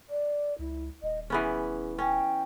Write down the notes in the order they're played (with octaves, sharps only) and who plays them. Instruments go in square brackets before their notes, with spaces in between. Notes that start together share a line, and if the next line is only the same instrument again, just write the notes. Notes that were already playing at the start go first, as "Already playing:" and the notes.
[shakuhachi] D5
[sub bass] C#2 [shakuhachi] E4
[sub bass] D#1 [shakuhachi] D#5
[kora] E3 B3 C#4 [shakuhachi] G#4
[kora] C#4 [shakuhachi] G5